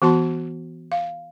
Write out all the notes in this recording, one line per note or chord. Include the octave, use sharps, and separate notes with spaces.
E3 B3 F#4 A5 C6
F5